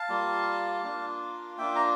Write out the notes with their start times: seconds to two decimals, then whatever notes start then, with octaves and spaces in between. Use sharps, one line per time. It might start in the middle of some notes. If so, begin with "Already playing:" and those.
Already playing: F5 A5
0.09 G3 A#3 F4
0.84 A#3 D4 F4
1.58 A#3 D4 F4 E5 G5
1.76 A#5